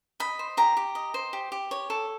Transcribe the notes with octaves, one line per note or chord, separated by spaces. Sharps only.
D#5 B5
C5
G4 A#5
G4
D#5
C5
G4
G4
C#5
A4